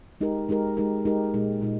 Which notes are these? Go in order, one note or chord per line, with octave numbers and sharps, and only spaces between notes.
G#3 D#4 G4 A#4
G#3 D#4 G4 A#4
G#3 D#4 G4 A#4
G#3 D#4 G4 A#4
A#2 G#3 D#4
A#2 G#3 D#4